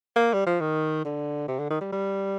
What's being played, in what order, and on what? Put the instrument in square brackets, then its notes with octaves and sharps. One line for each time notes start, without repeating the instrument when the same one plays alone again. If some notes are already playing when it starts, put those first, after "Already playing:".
[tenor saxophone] A#3
G3
F3
D#3
D3
C3
D3
D#3
G3
G3